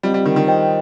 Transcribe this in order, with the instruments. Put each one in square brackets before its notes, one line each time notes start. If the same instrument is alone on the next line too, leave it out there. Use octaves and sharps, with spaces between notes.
[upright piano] G3 [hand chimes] C4 F4 D#5
[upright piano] G3
D#3
D#3
[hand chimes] F4 C5 D#5 G5